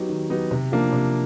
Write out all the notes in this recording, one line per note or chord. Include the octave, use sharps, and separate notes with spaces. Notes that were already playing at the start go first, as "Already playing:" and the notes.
Already playing: F#3 B3 D#4 G4
D#3
F#3 B3 D#4 G4
C3
F3 A#3 D4
C3